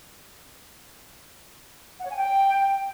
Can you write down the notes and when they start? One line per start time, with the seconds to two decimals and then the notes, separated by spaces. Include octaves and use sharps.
2.00 F#5
2.05 C#5
2.11 G#5
2.16 G5